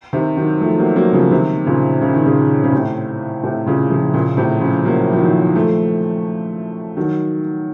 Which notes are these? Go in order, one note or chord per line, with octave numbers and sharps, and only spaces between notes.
C3 D#3
D#3 F#3
F3 A3
F#3 A#3
F#3 A#3
C#3 F3
C3 D#3
A#2 C#3
C#3
D#3
A#2 C#3
C#3
A2 C3
A2 C3
A#2 C#3
C#3 F3
A#2 C#3
A2 C3
C#3 F3
F#3 A#3
F3
D#3 F#3
F3 A3
D#3 F#3